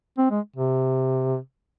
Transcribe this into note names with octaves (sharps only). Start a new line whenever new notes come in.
C4
G#3
C3